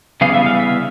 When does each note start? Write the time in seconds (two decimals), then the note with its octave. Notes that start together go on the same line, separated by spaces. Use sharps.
0.21 C#3 E3 G3 B3 F5
0.34 E5
0.46 F5
0.60 E5